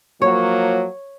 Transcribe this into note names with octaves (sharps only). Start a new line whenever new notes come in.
F3 F#3 A#3 C#5